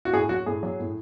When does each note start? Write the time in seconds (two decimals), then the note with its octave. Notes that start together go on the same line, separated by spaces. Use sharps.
0.05 F#4
0.13 A2 G#4
0.29 F#3 F#4
0.46 A2 G#4
0.63 F#3
0.80 A2